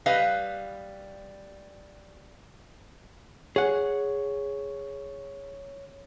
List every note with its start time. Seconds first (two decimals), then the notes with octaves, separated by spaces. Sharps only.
0.06 G3 B4 D#5 F5
3.56 G#4 C#5 F#5